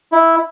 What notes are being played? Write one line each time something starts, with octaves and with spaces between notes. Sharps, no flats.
E4